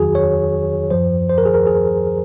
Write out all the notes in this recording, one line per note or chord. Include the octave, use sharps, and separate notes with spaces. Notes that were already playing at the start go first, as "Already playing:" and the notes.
Already playing: F2 D#3 F#3 F#4 G#4
C#5
F#2 F3 C5
C5
A#4
G#4
A#4
G#4